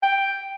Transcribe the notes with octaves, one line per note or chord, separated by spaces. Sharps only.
G5